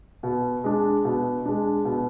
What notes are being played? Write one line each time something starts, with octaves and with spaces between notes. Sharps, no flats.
B2
G#3 D4
B2
G#3 D4
B2